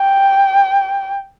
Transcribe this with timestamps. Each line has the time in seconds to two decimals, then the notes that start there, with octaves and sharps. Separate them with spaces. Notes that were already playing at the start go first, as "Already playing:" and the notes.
Already playing: G5